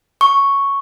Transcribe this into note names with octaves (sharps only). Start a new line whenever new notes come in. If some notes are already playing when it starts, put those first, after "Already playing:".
C#6